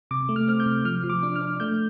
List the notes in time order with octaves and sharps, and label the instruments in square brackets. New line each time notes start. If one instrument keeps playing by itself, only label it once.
[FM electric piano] C3 D6
A3
F6
C4 F6
G6
C3
F3 F6
F3
D6
D4
F6
D4
A3 G6